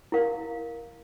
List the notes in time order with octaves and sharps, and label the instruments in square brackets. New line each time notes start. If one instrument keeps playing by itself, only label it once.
[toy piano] E4 A#4 F5